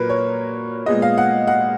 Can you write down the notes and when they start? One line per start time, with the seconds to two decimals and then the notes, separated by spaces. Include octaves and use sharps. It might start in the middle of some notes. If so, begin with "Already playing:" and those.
Already playing: A#2 F#3 A#3 A#4 B4
0.09 C#5
0.86 A#2 G#3 B3 D#5
1.02 F5
1.18 F#5
1.47 F#5